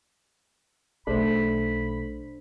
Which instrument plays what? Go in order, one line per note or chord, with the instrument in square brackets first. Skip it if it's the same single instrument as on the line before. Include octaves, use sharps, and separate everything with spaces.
[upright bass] B1 [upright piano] A3 [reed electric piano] D4 C5 [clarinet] B5